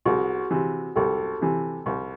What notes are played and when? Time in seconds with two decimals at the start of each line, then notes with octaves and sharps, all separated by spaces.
0.05 C2 F#4 G#4
0.51 C3 E3
0.96 C2 G4 A4
1.41 C3 E3
1.86 C2